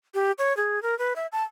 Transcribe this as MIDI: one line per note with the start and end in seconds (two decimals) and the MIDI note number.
0.14 0.32 67
0.38 0.55 73
0.57 0.82 68
0.83 0.97 70
0.99 1.13 71
1.16 1.27 76
1.32 1.43 81